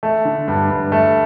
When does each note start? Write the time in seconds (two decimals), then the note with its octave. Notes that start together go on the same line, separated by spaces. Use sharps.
0.03 A3
0.25 D3
0.48 G2
0.70 G2
0.92 A3